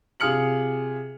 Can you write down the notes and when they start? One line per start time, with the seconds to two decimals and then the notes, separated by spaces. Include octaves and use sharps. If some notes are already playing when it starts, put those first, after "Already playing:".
0.20 C3 F4 G#4 F6 C#7 F#7